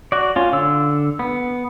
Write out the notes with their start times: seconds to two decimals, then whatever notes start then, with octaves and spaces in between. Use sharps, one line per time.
0.12 F#4 D5
0.36 C#4 F4
0.53 D3 E6
1.19 B3